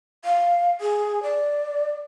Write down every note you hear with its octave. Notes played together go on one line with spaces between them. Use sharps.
F5
G#4
D5